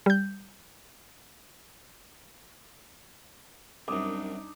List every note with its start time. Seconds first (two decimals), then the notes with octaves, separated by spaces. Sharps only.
0.06 G3 G6
3.88 C2 F#2 D4 D#4 D6 D#6